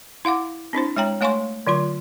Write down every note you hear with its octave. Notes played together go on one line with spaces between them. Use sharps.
E4 F5 F#5 D6
C4 D4 E4 C5
G#3 C#5 G5 A#5
A3 C#5 F5 G#5 C6 C#6
D3 F#3 F4 C6